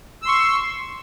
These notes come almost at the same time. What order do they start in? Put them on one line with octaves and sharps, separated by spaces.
E6 C6 C#6